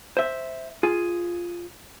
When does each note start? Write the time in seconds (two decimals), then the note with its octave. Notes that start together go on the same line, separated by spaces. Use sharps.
0.17 C5 E5
0.83 F4 G#4